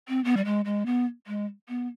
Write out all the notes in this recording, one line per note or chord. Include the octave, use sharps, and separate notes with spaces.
C4
B3
G3
G#3
G#3
B3
G#3
B3